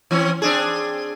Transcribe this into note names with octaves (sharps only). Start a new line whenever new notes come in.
E3 C4 C#4
C4 D4 G#4